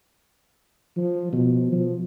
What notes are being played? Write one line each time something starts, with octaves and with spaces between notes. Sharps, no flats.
F3
B2
F3